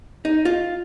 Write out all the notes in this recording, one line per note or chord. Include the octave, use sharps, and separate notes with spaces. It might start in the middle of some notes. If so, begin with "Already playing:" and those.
D#4
F4